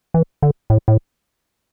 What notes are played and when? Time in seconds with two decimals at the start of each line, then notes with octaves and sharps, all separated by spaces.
0.14 E3
0.42 D3
0.70 A2
0.88 A2